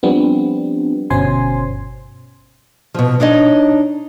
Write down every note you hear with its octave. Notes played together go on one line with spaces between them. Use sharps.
F3 G3 B3 C4 D4
G1 B2 C#4 C5 G#5 C6
B2 F3
D4 D#4 C#5 D#5